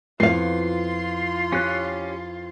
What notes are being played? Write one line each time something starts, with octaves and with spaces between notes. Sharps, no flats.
F2 E3 B3 F4 F5 C6 C7
C#4 G4 F#6